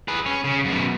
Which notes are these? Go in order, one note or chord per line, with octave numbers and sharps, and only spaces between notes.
G#4 B4
C#4
C#3
F#2 B2